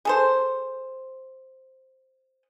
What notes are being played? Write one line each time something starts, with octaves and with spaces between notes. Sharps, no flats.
G#4 A4 C5